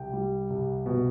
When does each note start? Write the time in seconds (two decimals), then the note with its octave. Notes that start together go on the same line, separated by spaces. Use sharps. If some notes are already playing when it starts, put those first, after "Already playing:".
Already playing: C2 G5
0.13 G3
0.50 C2
0.86 B2